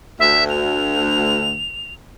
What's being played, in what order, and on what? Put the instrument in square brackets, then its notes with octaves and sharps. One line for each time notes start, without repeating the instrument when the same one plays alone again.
[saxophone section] D2 [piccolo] E5
[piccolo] F7